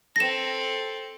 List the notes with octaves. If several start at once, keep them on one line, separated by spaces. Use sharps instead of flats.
C4 A4 A#6 E7